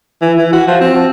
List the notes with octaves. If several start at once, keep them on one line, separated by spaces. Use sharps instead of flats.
E3
E3
F#4
F3
C4